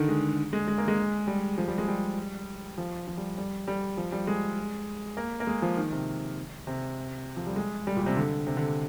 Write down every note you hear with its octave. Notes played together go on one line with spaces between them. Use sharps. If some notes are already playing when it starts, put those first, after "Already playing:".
Already playing: D3 D#3
G#3
G#3
G#3
A#3
G#3
G3
F3
G3
G#3
G3
F3
F3
G3
G3
G3
F3
G3
G#3
A#3
A#3
G#3
F3
D#3
C3
C3
F3
G3
G#3
G3
A#2
C3
D3
C3
D3